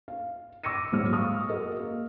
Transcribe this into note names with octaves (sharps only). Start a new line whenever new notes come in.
F5
D6 E6 A#6 C#7 D#7
D#1 G#2 F#3 F6
F5 C#6 D#6 F6
F#4 G#4 A#4 D#5
A#3